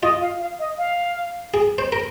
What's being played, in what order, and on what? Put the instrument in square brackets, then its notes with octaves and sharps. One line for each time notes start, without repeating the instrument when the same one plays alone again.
[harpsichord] F4 [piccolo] D#5
[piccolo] F5
F5
D#5
F5
[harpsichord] G#4
C5
A#4